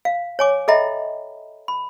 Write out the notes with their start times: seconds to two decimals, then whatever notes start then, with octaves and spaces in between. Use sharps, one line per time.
0.05 F5
0.39 C#5 G#5 D6
0.68 A4 D#5 E5 G5 A#5 B5
1.68 B5